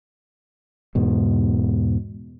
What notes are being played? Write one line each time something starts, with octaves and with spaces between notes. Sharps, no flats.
E2 G#2 B2